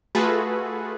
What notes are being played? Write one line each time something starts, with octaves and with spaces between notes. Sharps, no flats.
A3 F4 F#4 G#4 A4 B4